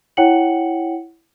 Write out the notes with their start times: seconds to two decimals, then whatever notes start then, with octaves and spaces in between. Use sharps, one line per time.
0.17 E4 C#5 F#5 G5 C#7 F#7